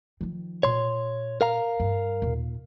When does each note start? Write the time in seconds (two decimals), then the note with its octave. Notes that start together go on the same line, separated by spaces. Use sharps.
0.21 D#3 F3
0.63 A#2 C#5 C6
1.41 A#4 F5 A#5
1.80 G2
2.22 D#2 A#2